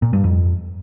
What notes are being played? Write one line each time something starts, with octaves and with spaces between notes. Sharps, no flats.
A#2
G2
F2